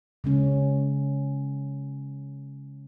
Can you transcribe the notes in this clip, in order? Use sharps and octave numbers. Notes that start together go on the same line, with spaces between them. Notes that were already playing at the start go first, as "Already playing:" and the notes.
C#3 G#3 C#4